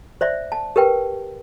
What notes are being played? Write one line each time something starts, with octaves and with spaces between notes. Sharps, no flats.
C5 D5 E5
A5
G4 A#4 B4 G5